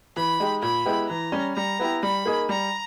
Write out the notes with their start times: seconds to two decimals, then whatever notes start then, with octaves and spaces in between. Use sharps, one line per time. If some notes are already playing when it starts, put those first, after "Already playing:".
0.16 E3 B5
0.40 G#3 D#4 G4
0.62 A#2 B5
0.86 G#3 B3 E4 G4
1.09 E3 A#5
1.32 G3 C#4
1.55 G3 A#5
1.79 B3 E4 G4
2.03 G3 B5
2.25 A#3 D#4 G#4
2.49 G3 A#5